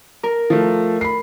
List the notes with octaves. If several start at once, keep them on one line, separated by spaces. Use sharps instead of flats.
A#4
F3 A3
B5 C7